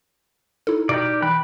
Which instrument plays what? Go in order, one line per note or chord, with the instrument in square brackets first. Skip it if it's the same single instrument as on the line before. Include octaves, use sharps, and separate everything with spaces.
[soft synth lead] D#4 [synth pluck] E4 A4
[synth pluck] B2 [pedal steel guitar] G4 A#4 D5
[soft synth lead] E3 [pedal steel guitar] G5 B5 F#6